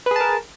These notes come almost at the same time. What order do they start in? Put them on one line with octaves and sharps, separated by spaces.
B4 G#4 A5 A#4